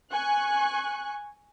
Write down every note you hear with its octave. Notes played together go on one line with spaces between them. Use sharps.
G#5 C#6 F#6